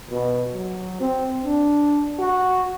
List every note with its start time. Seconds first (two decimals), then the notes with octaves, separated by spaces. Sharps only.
0.11 B2
0.53 F#3
1.01 C4
1.45 D4
2.19 F#4